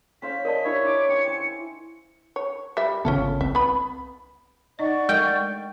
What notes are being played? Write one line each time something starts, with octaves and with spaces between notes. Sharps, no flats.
C#4 C5 F5 B6
A#4 D5 D#5 A5
D4 E4 G4 C#5
D6
C#4 G5 C#7
C5 G#5
C#5
G3 E5
G#1 C#3 B3 C#4 F4 A4
C2 C4 E5
B3 B5
D#4 D5 D#5 F#5 C#6
G#3 A#4 D#5 G5